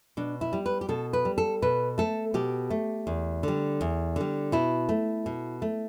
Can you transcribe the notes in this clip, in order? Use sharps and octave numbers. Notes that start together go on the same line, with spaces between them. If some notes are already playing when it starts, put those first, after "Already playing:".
B2 D4
E4
G3
B4
G4
B2 A4
B4
G3
A4
B2 B4
A3 A4
B2 G4
A3
E2
D3 G3
E2
D3 G3
B2 E4
A3
B2
A3